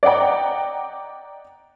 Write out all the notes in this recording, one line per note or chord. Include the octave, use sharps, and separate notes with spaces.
D5 D#5 F#5 G5 A#5